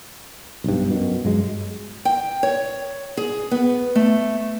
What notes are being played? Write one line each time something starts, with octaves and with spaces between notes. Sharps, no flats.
B1 G2
F#2 B2
G2 F#3 G#3
G5
C#5
G#4
B3
A3